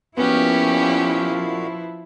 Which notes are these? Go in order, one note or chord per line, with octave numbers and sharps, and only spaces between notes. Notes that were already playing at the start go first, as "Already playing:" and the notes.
A#2 F3 B3 C#4 E4 F#4 G4 F5